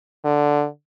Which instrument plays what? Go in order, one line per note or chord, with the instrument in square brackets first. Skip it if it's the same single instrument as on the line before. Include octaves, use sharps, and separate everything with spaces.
[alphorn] D3